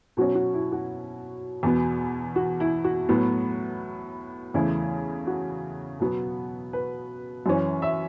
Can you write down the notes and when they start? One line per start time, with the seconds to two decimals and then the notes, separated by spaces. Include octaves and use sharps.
0.17 B2 F#3 C#4 F#4
0.35 F#4
0.54 E4
0.72 F#4
1.63 E2 B2 B3
2.36 F#4
2.60 E4
2.84 F#4
3.09 A2 F#3 B3
4.54 E2 C#3 E3 A3 E4
5.27 F#4
6.00 B2 F#3 B3
6.73 B4
7.46 F#2 E3 C#4
7.82 E5